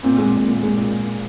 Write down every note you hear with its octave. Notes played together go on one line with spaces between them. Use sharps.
A#2 C4
G#3
A#2
A#2
G#3
A#2